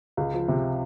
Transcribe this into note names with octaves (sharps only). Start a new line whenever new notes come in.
C#2
F3
C3